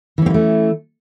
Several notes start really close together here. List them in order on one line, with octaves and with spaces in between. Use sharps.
E3 C#4 C4 A#3 A3